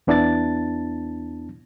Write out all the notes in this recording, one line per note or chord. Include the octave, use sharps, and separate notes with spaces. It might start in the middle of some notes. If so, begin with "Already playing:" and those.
E2 B3 D4 E4 A5 A6